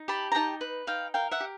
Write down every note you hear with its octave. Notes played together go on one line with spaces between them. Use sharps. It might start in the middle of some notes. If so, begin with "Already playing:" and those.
Already playing: D#4
G4 A5 B5
A#5
D#4 G5 A5
B4
D#4 F5 G5
A#4 F5 G5
E5 F#5
G4